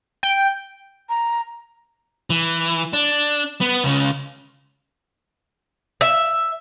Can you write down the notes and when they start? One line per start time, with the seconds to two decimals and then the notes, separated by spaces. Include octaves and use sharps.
0.23 G5
1.09 A#5
2.30 E3
2.93 D4
3.61 B3
3.84 C#2 C#3
6.01 E5